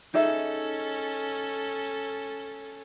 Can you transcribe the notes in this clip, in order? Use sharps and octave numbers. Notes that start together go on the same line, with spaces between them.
C#4 D#4 G#4 A4 E5